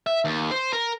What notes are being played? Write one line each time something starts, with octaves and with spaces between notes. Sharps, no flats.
E5
D#2
C5
A#4